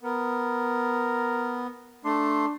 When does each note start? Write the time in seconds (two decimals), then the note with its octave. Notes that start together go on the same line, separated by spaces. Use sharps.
0.03 B3 A#4
2.05 A3 D4 C6